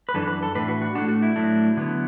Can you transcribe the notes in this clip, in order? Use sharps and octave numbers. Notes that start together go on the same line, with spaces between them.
B4
F#2 E3 D4 A4
B4
A4
A2 E3 D4 B4
F#4
F#4
A2 A3 D4 F#4
F#4
E4
A2 F#3 A3 D4
D3 F#3 B3